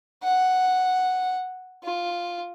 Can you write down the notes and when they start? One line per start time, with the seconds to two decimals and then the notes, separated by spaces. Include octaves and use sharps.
0.23 F#5
1.84 F4